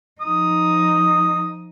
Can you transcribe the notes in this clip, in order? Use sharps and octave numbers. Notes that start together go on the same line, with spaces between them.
F3 D#4 D#6